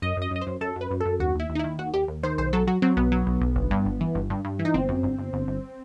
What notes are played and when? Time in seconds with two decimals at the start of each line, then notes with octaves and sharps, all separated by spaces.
0.02 F#2 D#5
0.17 F#2 D#5
0.31 F#2 D#5
0.41 C5
0.47 F#2
0.61 F#2 A4
0.76 F#2
0.81 B4
0.91 F#2
1.00 A4
1.06 F#2
1.20 D#2 F#4
1.35 D#2 E4
1.50 D#2
1.55 D#4
1.59 D#3 E4
1.79 D#2 F#4
1.94 D#2 G4
2.08 D#2
2.23 D#3 C5
2.38 B1 C5
2.53 F#3 A4
2.67 F#3 F#4
2.82 F#3 C4
2.97 B1 B3
3.12 F#3
3.27 B1
3.41 B1
3.56 G1
3.71 G2
3.86 G1
4.01 E3
4.15 G1
4.30 G2
4.45 G2
4.59 E3
4.65 D#4
4.74 G1 C4
4.89 F#2
5.03 G1
5.18 G1
5.33 G1
5.48 G1